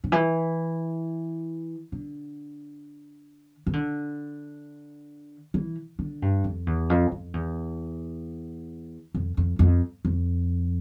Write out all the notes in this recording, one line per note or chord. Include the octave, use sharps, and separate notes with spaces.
D3
E3
D3
E3
D3
E3
D3
G2
F2
E2
F2
F2
E2
F2
F2
F2
F2